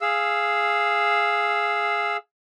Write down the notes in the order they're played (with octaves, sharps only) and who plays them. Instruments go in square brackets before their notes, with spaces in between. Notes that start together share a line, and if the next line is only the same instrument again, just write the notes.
[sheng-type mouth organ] G#4 F5 E6